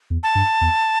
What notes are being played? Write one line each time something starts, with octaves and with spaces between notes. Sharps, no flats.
E2
A5
G2
E2